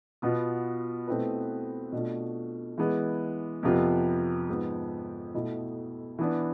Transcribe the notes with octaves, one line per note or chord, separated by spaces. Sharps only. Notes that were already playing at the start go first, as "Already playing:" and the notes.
B2 B3 F4
B2 A3 C4 E4 B4
B2 A3 D4 F4
E3 G#3 B3
F2 C3 F3 B3 F4
G#2 F3 B3
B2 A3 E4
E3 B3 D4